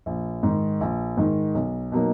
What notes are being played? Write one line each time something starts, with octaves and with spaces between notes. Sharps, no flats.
A#1
G#2 D#3
A#1
G#2 D#3
B1
B2 F#3 A#3 D#4